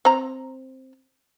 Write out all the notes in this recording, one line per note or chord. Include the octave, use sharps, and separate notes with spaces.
C4 A#5